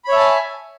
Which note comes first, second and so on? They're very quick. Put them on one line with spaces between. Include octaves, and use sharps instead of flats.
B5 C#5 E5 A5 G#5